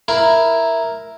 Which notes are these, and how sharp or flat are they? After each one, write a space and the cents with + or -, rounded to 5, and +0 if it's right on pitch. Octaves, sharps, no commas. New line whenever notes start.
E4 +0 A#4 +0